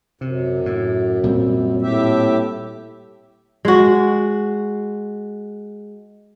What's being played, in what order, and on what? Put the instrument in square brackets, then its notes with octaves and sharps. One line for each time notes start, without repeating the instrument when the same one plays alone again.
[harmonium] F#2 [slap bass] C3
[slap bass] A2
A#2 G3 C4
[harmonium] A2 G4 E5
[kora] G#3 F#4